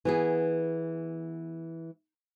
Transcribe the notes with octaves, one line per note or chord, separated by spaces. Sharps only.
E3 B3 G#4